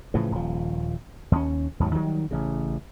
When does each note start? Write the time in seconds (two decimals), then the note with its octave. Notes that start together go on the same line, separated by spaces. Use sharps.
0.14 A2 C#3 E3 F3
0.32 D#1 F3
1.32 D#2 B3 C#4
1.80 D#2 G#2 F#3
1.95 D#3 F#3 G3
2.31 A1 C#3